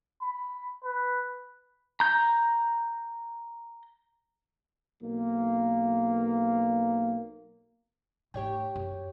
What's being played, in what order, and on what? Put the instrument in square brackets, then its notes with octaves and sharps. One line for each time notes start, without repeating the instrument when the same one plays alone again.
[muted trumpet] B5
B4
[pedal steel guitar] A#5 G6
[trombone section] B1 A#3
[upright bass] G#2 A3 [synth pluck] G4 C#5 G5
[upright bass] F#2